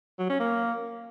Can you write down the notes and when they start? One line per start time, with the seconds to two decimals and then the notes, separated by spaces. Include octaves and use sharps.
0.19 F#3
0.29 C#4
0.40 A#3